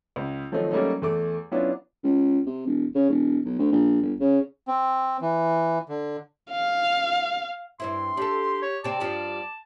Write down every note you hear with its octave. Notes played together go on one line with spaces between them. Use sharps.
C#2
D#3 F3 F#3 A3 C4 D#4
F#3 G3 A3 A#3 C#4 D#4
E2 A3 D6
F#3 B3 C#4 D4 E4 F4
C#2
C3
E1
C#3
E1
B1
D2
A#1
G1
C#3
C4
E3
D3
F5
G2 C4 E4 C6
D4 G4 A4
C#5
C3 C4 D5 A5
G2 F3 G3